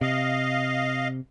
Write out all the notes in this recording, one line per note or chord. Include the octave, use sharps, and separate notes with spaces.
C3 D#5 F5